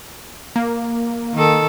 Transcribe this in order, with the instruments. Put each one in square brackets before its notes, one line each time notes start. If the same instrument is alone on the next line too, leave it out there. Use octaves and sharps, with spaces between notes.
[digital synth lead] A#3
[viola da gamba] D#3 A4